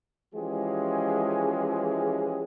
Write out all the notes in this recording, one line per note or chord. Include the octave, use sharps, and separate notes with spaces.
E3 F3 G#3 C#4 G4 G#4